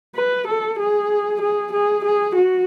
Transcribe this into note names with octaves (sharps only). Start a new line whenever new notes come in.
B4
A4
G#4
G#4
G#4
G#4
F#4